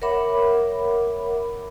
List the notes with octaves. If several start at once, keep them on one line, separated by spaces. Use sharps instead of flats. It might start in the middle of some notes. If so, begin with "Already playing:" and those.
A#4 C#5 E5 F#5 B5 D6